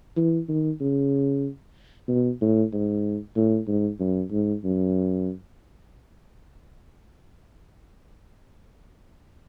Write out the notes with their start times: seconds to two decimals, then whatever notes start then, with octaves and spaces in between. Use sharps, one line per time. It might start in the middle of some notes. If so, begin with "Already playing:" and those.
0.17 E3
0.49 D#3
0.81 C#3
2.08 B2
2.41 A2
2.73 G#2
3.36 A2
3.68 G#2
4.00 F#2
4.32 G#2
4.64 F#2